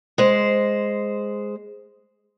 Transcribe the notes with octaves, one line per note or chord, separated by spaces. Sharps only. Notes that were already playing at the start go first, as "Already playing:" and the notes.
G#3 C5